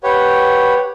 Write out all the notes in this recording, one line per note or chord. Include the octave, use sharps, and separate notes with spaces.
G4 B4 C#5 F#5